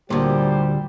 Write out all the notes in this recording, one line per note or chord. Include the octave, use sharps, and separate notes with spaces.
D2 A#2 G3 G4 C5